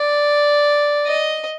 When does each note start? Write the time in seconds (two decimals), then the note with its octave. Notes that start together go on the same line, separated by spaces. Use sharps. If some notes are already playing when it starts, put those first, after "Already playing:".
Already playing: D5
1.06 D#5